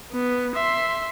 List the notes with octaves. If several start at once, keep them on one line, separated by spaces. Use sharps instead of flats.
B3
E5 C6